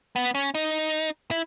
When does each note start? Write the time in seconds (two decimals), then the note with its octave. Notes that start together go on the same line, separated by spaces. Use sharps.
0.16 B3
0.35 C#4
0.54 D#4
1.31 E4